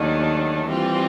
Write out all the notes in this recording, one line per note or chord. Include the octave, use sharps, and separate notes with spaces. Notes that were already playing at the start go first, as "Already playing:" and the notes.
Already playing: D#2 D#3 F#3 A3 D4
E3 G3 C4 F4